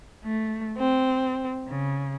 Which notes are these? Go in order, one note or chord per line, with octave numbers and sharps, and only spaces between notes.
A3
C4
C#3